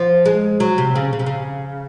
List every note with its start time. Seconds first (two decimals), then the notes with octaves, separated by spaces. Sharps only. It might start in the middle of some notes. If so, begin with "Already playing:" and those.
Already playing: F3
0.25 G#3
0.60 F#3
0.78 C3
0.95 C#3
1.13 C#3
1.19 C3
1.26 C#3